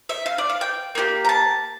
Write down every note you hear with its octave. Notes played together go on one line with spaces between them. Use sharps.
E5
F5
D5
F5
G5
A#3 E4 G4
A#5
A5